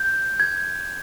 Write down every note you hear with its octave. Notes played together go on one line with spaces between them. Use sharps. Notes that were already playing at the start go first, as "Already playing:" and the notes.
Already playing: G6
G#6